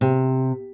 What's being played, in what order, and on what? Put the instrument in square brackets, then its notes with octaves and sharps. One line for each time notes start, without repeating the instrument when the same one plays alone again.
[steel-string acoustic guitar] C3